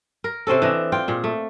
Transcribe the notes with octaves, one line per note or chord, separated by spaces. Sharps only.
A#4
C3 C4 C#4 A4
E3 D4 D#5
F4 G5
A#2 G#4
A3